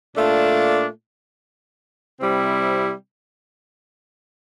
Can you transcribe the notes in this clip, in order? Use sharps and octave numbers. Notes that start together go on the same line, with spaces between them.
A#2 A3 D4 F4
C3 G3 C4 E4